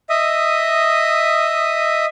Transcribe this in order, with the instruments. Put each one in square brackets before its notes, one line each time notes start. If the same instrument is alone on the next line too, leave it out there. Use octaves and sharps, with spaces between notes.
[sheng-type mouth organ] D#5 E5 D#6